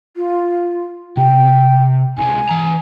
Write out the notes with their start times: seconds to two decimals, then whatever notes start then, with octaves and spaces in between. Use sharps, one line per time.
0.17 F4
1.17 C3 G5
2.18 C2 G#3 G#5
2.49 E3 A#5